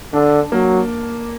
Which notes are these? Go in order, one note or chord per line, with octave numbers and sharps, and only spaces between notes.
D3 D4
F#3 A#3